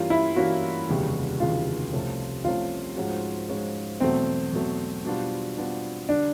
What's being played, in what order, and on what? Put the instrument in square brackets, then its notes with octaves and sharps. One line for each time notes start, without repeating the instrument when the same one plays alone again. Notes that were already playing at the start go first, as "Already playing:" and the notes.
Already playing: [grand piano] G2 E3 G3 A#3 C#4 [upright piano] F4
[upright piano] E4
[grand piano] G2 E3 G3 A#3 C#4 [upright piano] F#4
[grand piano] F1 D#2 C#3 E3 G3
[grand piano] F1 D#2 C#3 E3 G3 [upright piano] F4
[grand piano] C2 C3 F3 A3 C#4
[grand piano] C2 C3 F3 A3 C#4 [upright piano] F4
[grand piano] G#2 F3 G#3 C#4 F#4
G#2 F3 G#3 C#4 F#4
[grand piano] E2 B2 F#3 A3 [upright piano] C4
[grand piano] E2 B2 F#3 A3
B2 G3 B3 D4 F4
B2 G3 B3 D4 F4
[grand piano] D3 G3 [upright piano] D4